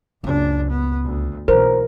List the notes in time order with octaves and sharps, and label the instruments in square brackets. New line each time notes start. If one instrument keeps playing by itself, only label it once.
[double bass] F#1 D4 [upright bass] C#2
[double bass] B3
D2
[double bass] B1 [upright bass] E3 [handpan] A#4 [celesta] C5